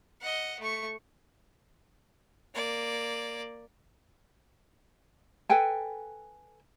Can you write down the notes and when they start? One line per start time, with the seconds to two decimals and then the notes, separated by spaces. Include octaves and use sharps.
0.21 D#5 F#5
0.60 A3 C#6
2.54 A#3 D5
5.49 A4 B4 G5 G#5